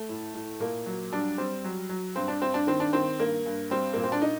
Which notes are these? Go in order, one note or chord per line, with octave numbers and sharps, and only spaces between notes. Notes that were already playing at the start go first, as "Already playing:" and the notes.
Already playing: A3
A2
A2
A#2 A#3
F#3
G3 D4
G3 C4
F#3
F#3
G2 C4
D4
G2 C4
D4
D#3 C4
D4
D#3 C4
G2 A#3
G2
G3 C4
A#2 A#3
C4
D4
D#4